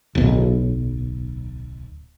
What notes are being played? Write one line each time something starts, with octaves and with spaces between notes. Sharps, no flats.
D1 B1